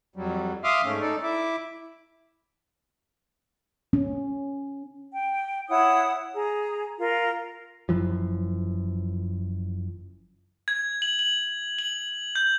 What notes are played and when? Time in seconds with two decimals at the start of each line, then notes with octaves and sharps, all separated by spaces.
0.16 F2 F#3 G3
0.64 E5 F5 C6 D6 D#6 F6
0.84 G#2 A3 C#4
1.01 D#4 A4 D5
1.23 E4 E5 D6
3.93 C#4
5.12 G5
5.68 E4 C#5 F#5 D#6
6.34 G#4 A#5
6.98 F4 A#4
7.89 F#1 F#2 E3 F3
10.68 G#6
11.02 F#7
11.19 F#7
11.79 F#7
12.35 G6